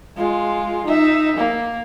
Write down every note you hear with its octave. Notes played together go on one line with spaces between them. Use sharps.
G#3 F4
D#4 E5
A#3